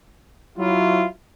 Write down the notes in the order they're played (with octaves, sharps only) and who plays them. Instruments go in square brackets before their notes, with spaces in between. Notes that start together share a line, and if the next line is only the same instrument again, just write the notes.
[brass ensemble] F#3 E4 F4